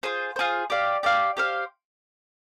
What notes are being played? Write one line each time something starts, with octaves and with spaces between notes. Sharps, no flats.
F4 G#4 C5
F4 G#4 C5
G4 D5 F5
G4 D5 F5
G4 C5 F5